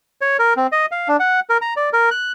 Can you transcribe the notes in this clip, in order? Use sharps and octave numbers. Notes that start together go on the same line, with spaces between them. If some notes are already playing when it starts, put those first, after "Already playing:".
C#5
A#4
C4
D#5
F5
D4
F#5
A#4
A#5
D5
A#4
F#6